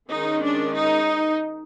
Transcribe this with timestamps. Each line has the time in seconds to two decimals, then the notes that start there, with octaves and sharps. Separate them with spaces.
0.11 D#3 G#3 C#4 D#4
0.44 D4
0.76 D#4